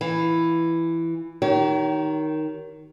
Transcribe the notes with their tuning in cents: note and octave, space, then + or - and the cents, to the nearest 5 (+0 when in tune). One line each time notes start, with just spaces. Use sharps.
E3 +5 F5 +0
D#3 +0 G4 -40 C#5 +15